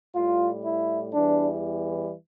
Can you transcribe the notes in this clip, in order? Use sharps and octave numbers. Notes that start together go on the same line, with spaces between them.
A2 G3 F4
E4
E2 E3 G3 D4